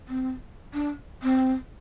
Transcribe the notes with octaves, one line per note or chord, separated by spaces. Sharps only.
C4
D4
C4